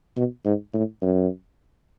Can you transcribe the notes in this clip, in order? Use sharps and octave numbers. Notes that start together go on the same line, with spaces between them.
B2
G#2
A2
F#2